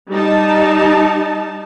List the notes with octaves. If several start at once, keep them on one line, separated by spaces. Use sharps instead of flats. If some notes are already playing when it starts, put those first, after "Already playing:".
G3 D#4 A5